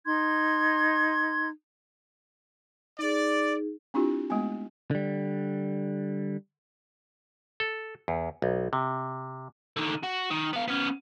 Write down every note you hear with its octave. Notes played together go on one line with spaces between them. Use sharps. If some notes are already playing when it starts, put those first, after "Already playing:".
D#4 C6 G#6
D#4 G#4 D5
C4 D4 E4 F4 G4
G#3 A3 B3 G#5
D3 G3
A4
E2
B1
C3
D3 D#3
F#4
D#3
B3 F5
B3 C#4